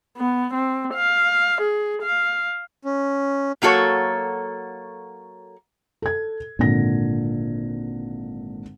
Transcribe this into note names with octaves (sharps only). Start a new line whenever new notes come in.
B3
C4
F5
G#4
F5
C#4
F#3 A#3 F#4 A4 C#5
A4 G#6
G#1 A#2 D3 A#6